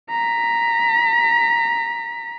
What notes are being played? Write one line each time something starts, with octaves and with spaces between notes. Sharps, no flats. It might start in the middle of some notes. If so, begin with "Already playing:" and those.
A#5 B6